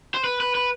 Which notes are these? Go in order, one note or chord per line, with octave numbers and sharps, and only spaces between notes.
C5
B4
B4
B4